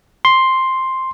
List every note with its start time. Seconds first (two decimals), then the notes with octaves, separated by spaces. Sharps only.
0.25 C6